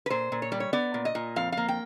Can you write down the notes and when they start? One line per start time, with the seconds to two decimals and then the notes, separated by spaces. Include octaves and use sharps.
0.06 B4
0.10 A#2 C5
0.32 A#2
0.42 C#5
0.52 G3 D5
0.60 C#5
0.73 B3 D5
0.94 A#2
1.05 D#5
1.15 A#2
1.36 F2 F5
1.52 A#3 F5
1.68 G5